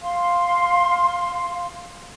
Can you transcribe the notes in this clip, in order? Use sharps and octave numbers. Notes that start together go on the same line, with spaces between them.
F5 C6